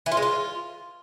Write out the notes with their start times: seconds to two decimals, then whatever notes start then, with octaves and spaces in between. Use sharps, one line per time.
0.06 E3
0.12 F4
0.17 G#3
0.22 F4